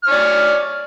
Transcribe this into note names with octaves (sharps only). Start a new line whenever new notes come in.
C#5 D5 F6